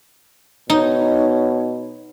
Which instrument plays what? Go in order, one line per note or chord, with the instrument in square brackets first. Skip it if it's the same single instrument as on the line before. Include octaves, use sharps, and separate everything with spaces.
[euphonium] B2 [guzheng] D#4 [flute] C#5